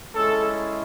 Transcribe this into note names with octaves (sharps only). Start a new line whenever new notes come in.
G#3 C#4 E4 A4